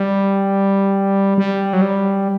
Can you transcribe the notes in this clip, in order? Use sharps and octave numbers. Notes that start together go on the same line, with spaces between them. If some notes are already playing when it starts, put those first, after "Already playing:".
Already playing: G3
G3
F#3
G3